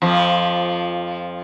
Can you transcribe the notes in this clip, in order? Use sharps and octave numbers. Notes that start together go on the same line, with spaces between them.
F2 F3